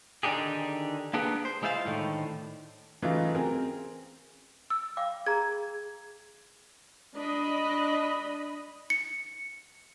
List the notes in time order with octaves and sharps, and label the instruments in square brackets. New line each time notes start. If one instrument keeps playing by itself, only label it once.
[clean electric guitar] D3 D#3 D4 D#4 G4 G#4
A#3 B3 D4 G4 G#4 B4
C5
G#3 E4 F4 C5 F5
A2 D3 D#3
[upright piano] C#3 E3 F#3 A3 D#4 F4
C4 G#4 A#4
[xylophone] E6
[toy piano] F5 G5 D6
[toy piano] G#4 A#5 [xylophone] G#6
[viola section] D4 D#5 B5
[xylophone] C#7